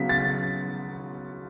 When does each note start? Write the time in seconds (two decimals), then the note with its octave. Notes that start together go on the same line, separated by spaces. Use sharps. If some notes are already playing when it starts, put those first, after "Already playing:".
Already playing: C#3 F#3 B3 B6
0.09 A6